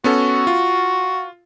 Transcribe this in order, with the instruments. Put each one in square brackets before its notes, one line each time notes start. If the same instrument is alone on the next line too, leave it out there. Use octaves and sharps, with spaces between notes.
[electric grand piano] B3 C#4 A4 [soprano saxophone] F#4
[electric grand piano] F4